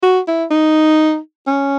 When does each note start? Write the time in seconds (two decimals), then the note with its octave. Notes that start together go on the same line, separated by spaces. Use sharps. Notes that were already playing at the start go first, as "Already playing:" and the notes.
0.03 F#4
0.28 E4
0.51 D#4
1.47 C#4